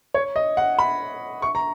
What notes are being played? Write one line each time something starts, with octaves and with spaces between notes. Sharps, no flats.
C#5
D#5
F#5
B5
C#6
A#5